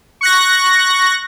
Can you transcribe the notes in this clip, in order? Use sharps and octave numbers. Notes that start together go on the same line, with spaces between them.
C#6 F#6 A#6